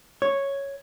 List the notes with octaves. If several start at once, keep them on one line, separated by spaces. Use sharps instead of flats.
C#5